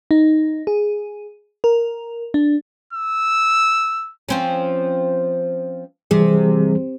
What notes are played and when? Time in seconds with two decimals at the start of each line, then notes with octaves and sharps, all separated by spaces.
0.11 D#4
0.67 G#4
1.64 A#4
2.34 D4
2.93 E6
4.29 F3 C4 C#4
6.11 C3 E3 G3 G#4